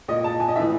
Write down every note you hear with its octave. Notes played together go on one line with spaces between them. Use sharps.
A#2 D#5
A5
G#5
D#5
A2 E3 E5